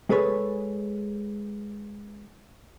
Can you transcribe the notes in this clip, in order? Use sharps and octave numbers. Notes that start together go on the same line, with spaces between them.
G#3 G#4 A4 B4 C#5